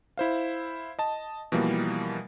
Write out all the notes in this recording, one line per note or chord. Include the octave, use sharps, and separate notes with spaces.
E4 C5 F5
D#5 A5
B2 E3 F3 G3 A#3